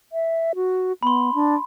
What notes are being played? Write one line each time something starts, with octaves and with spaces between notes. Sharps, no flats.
E5
F#4
B3 B5 C6
D4